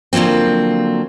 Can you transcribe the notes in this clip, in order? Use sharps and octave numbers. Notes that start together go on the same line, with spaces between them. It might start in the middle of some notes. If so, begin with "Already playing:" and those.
D3 F3 F#3 A#3 C4